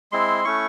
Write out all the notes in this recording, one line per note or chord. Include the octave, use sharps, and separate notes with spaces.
G#3 C4 E4 C6
A3 C#4 E4 C#6